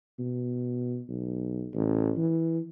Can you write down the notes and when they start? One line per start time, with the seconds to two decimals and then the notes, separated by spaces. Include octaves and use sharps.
0.19 B2
1.09 B1
1.74 A1
2.17 E3